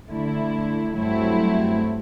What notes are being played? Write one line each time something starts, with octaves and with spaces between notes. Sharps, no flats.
D3 A3 E4
G2 F#3 A3 C4 E4